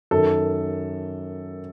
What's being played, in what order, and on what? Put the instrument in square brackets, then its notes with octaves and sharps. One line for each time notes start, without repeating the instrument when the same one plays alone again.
[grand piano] F#2 D#3 A4